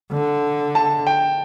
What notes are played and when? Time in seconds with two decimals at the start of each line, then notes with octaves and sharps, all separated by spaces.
0.12 D3
0.75 A5
1.07 G5